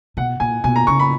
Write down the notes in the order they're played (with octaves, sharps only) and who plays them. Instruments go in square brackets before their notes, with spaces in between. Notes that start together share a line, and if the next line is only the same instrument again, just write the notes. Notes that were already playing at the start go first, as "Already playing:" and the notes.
[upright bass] B2 [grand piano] F#5
[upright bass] A#2 [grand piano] G#5
[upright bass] B2 [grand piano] G#5
[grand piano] A#5
[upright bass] C#3 [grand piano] C#6
[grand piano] B5